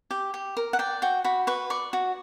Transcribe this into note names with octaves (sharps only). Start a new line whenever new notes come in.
G4
G4
A#4
F#5
D5 G5
F#4 G5
F#4 B5
B4 C#6
D5 C#6
F#4